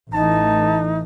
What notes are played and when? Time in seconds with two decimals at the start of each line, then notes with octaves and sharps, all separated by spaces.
0.13 A1 E3 A3 D#4 A5